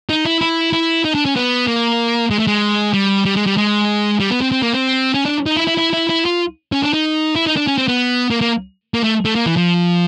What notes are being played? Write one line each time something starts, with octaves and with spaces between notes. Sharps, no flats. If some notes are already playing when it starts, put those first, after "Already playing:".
D#4
E4
E4
E4
D#4
D4
C#4
B3
A#3
G#3
A3
G#3
G3
G3
G#3
G3
G#3
G3
B3
C4
C4
A#3
C4
C#4
D4
D#4
E4
E4
E4
E4
E4
F4
C#4
D4
D#4
E4
D#4
D4
C#4
C4
B3
A#3
A#3
A#3
A3
A3
A#3
E3
F3